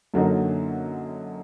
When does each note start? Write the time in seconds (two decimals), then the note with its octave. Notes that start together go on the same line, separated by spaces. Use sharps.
0.14 F#2 D3 F#3 A#3 D#4